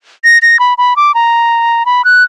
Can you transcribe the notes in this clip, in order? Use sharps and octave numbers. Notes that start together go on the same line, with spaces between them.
A#6
A#6
B5
B5
D6
A#5
B5
F#6